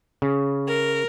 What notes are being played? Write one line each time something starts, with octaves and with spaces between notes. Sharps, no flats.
C#3
A#4